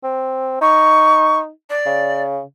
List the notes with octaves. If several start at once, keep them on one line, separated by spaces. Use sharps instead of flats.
C4
D#4 C#6
D5
C#3